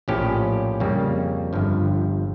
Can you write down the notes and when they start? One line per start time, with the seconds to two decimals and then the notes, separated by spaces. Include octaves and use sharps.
0.08 A#1 A2 F3 C#4 G4
0.80 F2 C#3 G3 A#3
1.53 G1 G2 F3